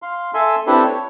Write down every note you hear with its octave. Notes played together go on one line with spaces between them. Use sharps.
F5 C6
A4 E5 G#5 C6
C4 D4 E4 G4 A4 B4
C#5